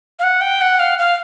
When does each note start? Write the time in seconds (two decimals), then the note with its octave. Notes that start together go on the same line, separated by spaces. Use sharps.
0.19 F5
0.23 F#5
0.41 G5
0.61 F#5
0.79 F5
0.99 F5